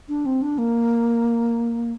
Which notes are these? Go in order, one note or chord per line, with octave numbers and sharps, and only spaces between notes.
D4
C4
D4
A#3